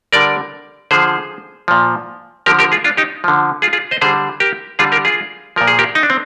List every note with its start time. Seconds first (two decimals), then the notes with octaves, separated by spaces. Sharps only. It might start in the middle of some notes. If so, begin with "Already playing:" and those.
0.13 D3 G3 A#4 D5
0.91 D3 F3 G#4 C5
1.68 A#2 F3
2.46 D3 F3 G4 A#4
2.59 G4 A#4
2.72 F4 G#4
2.84 D4 F4
2.97 D#4 G4
3.24 D3 F3
3.62 F4 G#4
3.73 F4 G#4
3.91 C5 D#5
4.01 D3 G3 G#4 C5
4.40 G4 A#4
4.79 D3 G3 F4 G#4
4.92 G4 A#4
5.05 F4 G#4
5.56 A#2 F3 A#4
5.67 G#4
5.79 G4 A#4
5.95 D#4
6.03 D4
6.10 C4